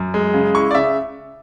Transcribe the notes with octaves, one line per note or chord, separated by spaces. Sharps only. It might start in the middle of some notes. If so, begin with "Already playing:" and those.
Already playing: F#2
G#3
C#3
E4 C#6
D5
C#3 E5